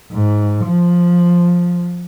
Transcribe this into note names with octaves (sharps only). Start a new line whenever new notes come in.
G#2
F3